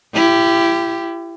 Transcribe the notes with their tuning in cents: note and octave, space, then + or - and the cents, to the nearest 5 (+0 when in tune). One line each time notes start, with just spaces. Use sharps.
E4 +35 G4 +0